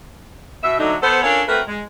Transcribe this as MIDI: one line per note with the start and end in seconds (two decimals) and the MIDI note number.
0.63 0.78 47
0.63 0.78 76
0.80 0.94 50
0.80 0.94 54
0.80 0.94 57
0.80 0.94 62
0.80 0.94 63
1.02 1.22 59
1.02 1.22 69
1.02 1.22 72
1.23 1.42 61
1.23 1.42 62
1.23 1.42 65
1.23 1.42 69
1.23 1.42 70
1.23 1.42 73
1.48 1.61 57
1.48 1.61 60
1.48 1.61 66
1.48 1.61 70
1.48 1.61 71
1.68 1.81 56